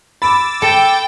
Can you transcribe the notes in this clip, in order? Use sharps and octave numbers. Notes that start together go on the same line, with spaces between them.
B5 D6 E6 A6
A4 G5